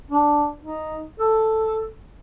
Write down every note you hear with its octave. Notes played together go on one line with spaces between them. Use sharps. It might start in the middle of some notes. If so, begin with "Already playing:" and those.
D4
D#4
A4